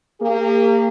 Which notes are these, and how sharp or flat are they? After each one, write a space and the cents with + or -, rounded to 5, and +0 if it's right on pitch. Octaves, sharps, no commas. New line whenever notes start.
A#3 -25 G4 +40